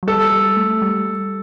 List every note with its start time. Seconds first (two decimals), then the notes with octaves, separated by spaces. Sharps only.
0.03 F#3
0.07 G3 A4
0.32 G3
0.57 A3
0.82 G3